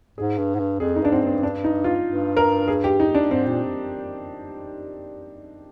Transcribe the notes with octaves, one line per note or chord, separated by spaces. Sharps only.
G#2 G#4
G2
G#2
G2
F2 G#4
D#4
G2 D4
G#2 C4
G2
C4
D4
D#4
F4
G2
A#4
G#4
G4
D#4
D4
G#2 C4
A#2